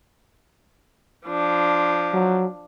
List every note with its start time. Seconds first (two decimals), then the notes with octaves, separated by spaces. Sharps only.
1.27 F3 D4
2.14 F#3